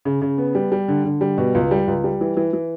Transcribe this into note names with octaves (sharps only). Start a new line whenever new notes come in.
C#3
C#3
B3
G3
G3
D3
D3
G3
B2
C#2
G3
C#2
G3
E3
E3
E3